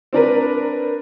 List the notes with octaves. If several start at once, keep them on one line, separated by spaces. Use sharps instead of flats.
C4 D4 A#4 B4